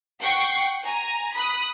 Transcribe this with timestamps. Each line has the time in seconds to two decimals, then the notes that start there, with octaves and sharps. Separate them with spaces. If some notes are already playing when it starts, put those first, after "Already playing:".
0.21 F#5 G5 C#6 C7
0.83 G#5 A#5
1.35 B5 D#6 F#6